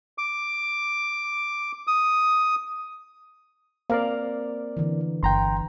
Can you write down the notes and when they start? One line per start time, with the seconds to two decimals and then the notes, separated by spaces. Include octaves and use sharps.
0.18 D6
1.87 D#6
3.90 A#3 C4 A#4 D5 F5
4.77 D3 E3
5.23 G1 G5 A#5 C6